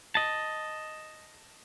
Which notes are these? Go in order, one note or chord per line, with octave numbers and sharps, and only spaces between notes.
D#5 A5